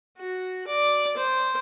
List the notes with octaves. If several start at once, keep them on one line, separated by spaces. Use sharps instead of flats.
F#4
D5
C5